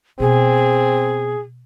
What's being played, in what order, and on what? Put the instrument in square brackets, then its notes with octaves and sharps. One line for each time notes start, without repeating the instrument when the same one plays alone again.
[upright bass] B2 [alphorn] C4 [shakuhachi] G#4